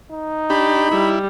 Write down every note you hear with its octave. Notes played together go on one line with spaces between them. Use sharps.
D#4
D4 G4 B5
G3 E4